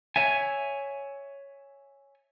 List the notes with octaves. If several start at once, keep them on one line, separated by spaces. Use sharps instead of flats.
C#5 E5 G#5